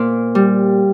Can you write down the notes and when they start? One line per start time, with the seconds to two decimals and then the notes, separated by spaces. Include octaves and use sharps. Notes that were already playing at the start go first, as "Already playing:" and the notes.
Already playing: A#2 C5
0.35 G3